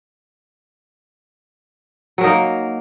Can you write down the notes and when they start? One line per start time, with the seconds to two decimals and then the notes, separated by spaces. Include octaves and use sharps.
2.18 F#3
2.21 A#4
2.24 D#4
2.27 A#3